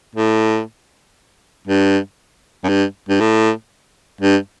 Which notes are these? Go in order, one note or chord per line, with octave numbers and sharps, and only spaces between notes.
A2
G2
F#2
G2
G2
A2
G2